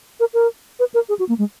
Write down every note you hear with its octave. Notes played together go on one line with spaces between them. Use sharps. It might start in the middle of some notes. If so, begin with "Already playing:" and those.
A#4
A#4
B4
A#4
G#4
F#4
A#3
G#3